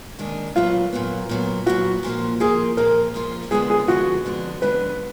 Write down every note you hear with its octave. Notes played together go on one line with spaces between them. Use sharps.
D#2 D#3 G#3 D4
A#2 F#3 B3 F4
A#2 F#3 B3
A#2 F#3 B3
A#2 F#3 B3 F#4
A#2 F3 A#3 F4
A#2 F3 A#3 F4 G#4
A#2 F3 A#3 F4 A#4
A#2 F3 A#3 F4
F2 D3 G#3 B3 D4 G#4
G#4
F2 D3 G#3 B3 D4 F#4
F2 D3 G#3 B3 D4
F2 D3 G#3 B3 D4 B4